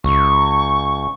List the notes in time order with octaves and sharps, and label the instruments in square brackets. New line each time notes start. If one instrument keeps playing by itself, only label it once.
[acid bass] C#2 [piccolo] C#6